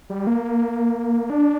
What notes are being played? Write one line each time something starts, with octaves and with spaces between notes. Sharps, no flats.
G3
A#3
D4